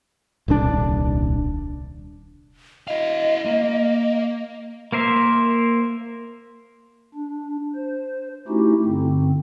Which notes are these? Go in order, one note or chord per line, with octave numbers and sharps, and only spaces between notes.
D#1 C2 C3 D4
E4 D#5 F5
A#3
A#3 A#4 C5 E5
D4
C5
A3 C#4 D#4 E4 F#4 G4
G2 D3 C4